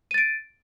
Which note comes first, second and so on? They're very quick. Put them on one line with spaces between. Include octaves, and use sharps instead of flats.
D#7 A6 D7